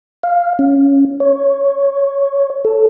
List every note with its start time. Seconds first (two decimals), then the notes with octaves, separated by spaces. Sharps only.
0.23 F5
0.59 C#4
1.20 C#5
2.65 A4